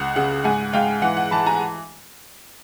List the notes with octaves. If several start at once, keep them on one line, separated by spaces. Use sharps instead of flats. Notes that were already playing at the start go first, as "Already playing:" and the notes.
Already playing: C#2 F#5
C#3 F#5
G#2 F#5 G#5
G#2 F5 G5
E3 F#5
F#5
E3 A5 B5
G#5 A#5